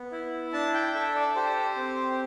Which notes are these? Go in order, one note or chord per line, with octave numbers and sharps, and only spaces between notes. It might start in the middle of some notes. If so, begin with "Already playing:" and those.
Already playing: B3
E4
D4 A5
G5
A4 E5
D5
G4 C5
C4